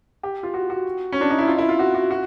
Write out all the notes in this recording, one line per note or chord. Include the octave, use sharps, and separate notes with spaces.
G4
F4
F#4
F#4
C#4
D4
D#4
E4
F4
E4
F4
F#4
F#4
F#4